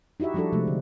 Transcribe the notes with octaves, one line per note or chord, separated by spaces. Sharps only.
D#4 E4 F#4 G4 E5
F3 G3 D4 F#4 A4
C3 F3 G#3 A3
D3